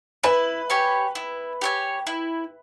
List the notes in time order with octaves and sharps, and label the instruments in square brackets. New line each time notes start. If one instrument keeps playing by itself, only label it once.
[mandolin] E4 [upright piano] B4
[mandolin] G4 C#5 G#5
E4
G4 C#5 G#5
E4